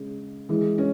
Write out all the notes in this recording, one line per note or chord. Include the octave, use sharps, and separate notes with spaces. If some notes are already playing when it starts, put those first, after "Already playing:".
Already playing: C#3 G#3
E3 G#3
C#4